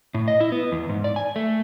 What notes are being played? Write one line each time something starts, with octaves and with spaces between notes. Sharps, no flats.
A2
D#5
E4
B3
E2
G#2
D5
G#5
A3